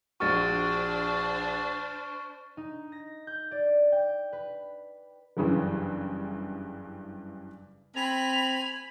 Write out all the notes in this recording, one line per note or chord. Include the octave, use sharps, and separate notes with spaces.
A#1 D4 F#4 C5 C#6 F6 A6
D#4
A#6
G6
D5
G5
B4
F#1 G2 C#3 E3
C4 G#5 B5 F7